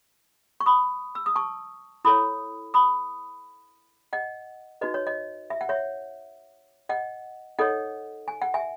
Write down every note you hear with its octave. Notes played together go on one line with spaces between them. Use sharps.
C#6
B5 D#6
E6
D#6
A5 C#6
E4 A4 C#5 B5 D#6
B5 D#6
D#5 F#5
D#4 F#4 B4 D#5
C#5
D#5
E5
F#5
C#5 E5
D#5 F#5
D#4 A4 C#5 D#5 F#5
G#5
F#5
E5 G#5